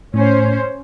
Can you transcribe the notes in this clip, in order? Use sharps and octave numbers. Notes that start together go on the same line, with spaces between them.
A2 C#4 C5